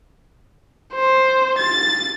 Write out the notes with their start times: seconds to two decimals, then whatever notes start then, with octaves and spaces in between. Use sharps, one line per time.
0.94 C5
1.59 A6